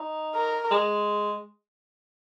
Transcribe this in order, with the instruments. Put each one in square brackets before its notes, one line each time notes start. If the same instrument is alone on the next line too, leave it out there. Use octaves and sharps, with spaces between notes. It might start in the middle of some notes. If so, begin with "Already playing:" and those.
Already playing: [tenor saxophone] D#4
[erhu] A#4
[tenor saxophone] G#3